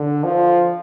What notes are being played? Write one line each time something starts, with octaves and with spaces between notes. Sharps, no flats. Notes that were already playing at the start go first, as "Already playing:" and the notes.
Already playing: D3
F3